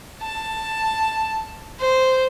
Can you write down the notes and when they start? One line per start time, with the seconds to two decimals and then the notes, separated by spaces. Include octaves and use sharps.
0.22 A5
1.79 C5